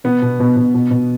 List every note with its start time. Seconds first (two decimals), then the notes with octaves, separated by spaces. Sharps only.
0.04 B2 B3
0.22 B2
0.40 B2
0.56 B2
0.74 B2
0.91 B2